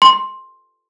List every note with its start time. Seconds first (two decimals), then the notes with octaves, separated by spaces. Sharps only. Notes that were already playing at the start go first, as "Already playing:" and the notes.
0.02 C6